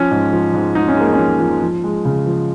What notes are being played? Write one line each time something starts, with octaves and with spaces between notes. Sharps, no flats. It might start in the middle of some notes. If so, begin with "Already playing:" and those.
Already playing: F3 C#4
G#2
F3
G#2
G#2 D#4
C#4
G#3 A#3
C#4
F3
F3
F3
G#3
C#3
F3